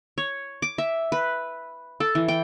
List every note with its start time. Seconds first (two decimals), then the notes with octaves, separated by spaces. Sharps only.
0.18 C#5
0.62 D6
0.78 E5
1.12 B4
2.00 A4
2.15 E3
2.28 G5